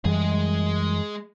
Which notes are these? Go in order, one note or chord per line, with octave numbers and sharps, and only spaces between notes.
F#2 E3 G3 G#3 G#4